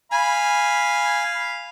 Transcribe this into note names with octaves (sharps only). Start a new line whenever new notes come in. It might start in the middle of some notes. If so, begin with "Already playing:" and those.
F5 G#5 B5